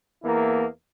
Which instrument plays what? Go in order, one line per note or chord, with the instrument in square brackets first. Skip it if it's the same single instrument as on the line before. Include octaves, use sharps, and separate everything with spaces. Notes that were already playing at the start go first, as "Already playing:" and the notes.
[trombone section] E2 A#3 E4 A#4